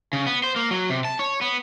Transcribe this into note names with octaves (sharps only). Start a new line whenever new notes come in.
C#3
B3
C5
A#3
F#3
C3
A5
C#5
B3